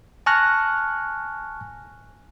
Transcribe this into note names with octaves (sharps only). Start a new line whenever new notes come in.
G#5 A5 C#6 F6 F#6 A#6